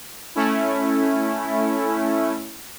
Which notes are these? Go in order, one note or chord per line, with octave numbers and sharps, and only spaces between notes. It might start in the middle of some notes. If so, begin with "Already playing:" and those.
A3 C#4 E4